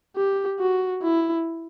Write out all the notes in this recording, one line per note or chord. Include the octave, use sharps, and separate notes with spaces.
G4
F#4
E4